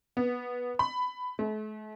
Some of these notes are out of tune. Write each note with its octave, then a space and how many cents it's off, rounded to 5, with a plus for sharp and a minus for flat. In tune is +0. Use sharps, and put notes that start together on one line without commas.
B3 -15
B5 +15
A3 -45